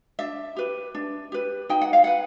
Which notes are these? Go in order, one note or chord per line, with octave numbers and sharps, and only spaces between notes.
D4 E5
G4 B4
D4
G4 B4
D#4 G5
F#5
F5
B4 F#5